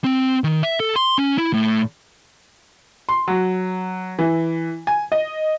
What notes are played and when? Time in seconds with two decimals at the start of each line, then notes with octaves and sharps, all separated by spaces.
0.04 C4
0.44 D#3
0.63 E5
0.80 A4
0.96 C6
1.18 C#4
1.38 E4
1.54 A2
3.09 C6
3.28 F#3
4.19 E3
4.87 G#5
5.12 D#5